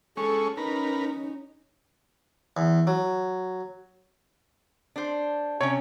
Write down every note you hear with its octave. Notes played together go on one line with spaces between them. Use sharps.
G#3 C#4 A4 C#6
C#4 D#4 A#4 B4
E2
F#3
D4 C5
C3 C#4 C#5